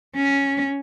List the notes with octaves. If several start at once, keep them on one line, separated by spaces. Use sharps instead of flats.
C#4